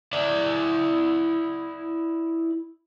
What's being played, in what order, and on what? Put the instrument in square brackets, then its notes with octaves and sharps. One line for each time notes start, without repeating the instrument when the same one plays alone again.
[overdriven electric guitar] E4 D5